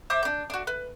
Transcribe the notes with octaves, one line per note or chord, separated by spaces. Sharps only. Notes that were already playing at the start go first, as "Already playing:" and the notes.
C5 E5 D6
D4 G6
D4 F#4
B4